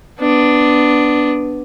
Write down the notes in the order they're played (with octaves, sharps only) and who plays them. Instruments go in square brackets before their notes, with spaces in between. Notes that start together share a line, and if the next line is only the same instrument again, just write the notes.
[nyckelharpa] B3 D4